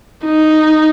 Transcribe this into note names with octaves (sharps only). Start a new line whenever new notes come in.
D#4